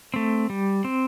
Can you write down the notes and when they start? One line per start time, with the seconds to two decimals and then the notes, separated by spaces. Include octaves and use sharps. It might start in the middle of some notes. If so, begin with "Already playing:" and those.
0.14 A3 C4
0.50 G3
0.85 C4